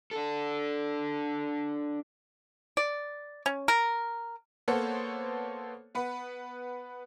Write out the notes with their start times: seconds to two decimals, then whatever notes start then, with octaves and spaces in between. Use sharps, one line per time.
0.11 D4 A4
2.77 D5
3.46 C#4
3.68 A#4
4.68 A#3 B3 A4 C5 C#5 F#5
5.95 B3 B4 F#5